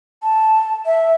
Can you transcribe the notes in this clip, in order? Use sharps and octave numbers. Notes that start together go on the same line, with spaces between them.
A5
E5